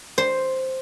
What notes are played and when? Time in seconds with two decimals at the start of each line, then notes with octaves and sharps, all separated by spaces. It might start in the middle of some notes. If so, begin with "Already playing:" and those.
0.18 C5